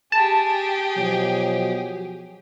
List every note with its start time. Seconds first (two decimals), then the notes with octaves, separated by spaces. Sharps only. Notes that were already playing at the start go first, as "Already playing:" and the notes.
0.12 G4 G#4 A5
0.97 B2 F3 F#3